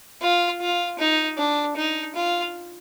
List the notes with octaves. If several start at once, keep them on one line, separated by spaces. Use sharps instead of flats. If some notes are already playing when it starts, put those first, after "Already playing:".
F4
F4
D#4
D4
D#4
F4